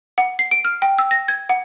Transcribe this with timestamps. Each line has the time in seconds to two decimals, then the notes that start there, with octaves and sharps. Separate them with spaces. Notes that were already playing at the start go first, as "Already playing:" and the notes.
0.18 F#5
0.39 C7
0.51 D7
0.65 F6
0.82 G5
0.99 E6
1.11 A#6
1.28 G#6
1.49 F#5